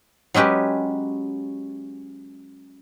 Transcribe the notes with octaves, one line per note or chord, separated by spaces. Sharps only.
F#3 G#3 C#4 G4 B4